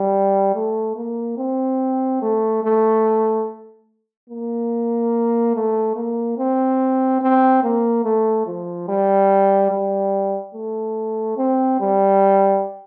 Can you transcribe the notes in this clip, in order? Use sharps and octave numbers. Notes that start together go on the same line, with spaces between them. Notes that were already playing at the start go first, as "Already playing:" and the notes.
Already playing: G3
A3
A#3
C4
A3
A3
A#3
A3
A#3
C4
C4
A#3
A3
F3
G3
G3
A3
C4
G3